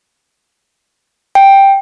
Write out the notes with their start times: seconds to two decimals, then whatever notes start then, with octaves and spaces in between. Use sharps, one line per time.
1.35 G5